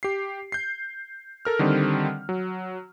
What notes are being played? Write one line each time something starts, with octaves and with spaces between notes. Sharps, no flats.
G4 C7
G6 C7
A4 A#4 F6
D3 D#3 G3 C4
F#3